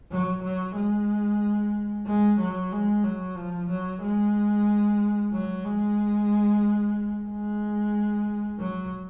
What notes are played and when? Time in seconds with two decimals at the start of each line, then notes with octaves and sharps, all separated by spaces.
0.11 F#3
0.43 F#3
0.76 G#3
2.06 G#3
2.40 F#3
2.72 G#3
3.04 F#3
3.36 F3
3.70 F#3
4.02 G#3
5.33 F#3
5.65 G#3
7.29 G#3
8.59 F#3